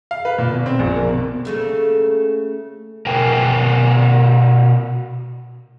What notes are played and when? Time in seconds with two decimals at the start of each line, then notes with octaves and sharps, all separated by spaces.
0.11 F5
0.25 B4
0.38 A#2
0.53 B2
0.66 C4
0.79 A#1
0.96 A#3
1.09 B2
1.45 C#3 A3 A#3
3.06 B2 A#4 B4 G5 G#5